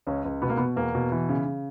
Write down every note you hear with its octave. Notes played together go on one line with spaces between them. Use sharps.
C#2 C#4
C#2
B2 B3
A#3
B2 B3
E2 A#3
B2
E3
C#3
C#3